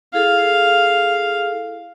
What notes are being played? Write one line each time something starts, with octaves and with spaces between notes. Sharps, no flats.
E4 G#4 A4 F5